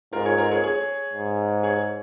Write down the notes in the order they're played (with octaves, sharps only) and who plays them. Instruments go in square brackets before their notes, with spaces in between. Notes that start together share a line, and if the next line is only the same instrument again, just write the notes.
[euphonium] G#2 [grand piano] F4 A#4
[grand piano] G#4 C#5
F4 A#4
G#4 C#5
G#4 C#5
[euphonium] G#2
[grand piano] G#4 C#5